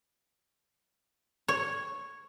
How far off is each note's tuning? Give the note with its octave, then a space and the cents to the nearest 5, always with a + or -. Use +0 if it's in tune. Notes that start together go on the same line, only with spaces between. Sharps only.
C#5 -5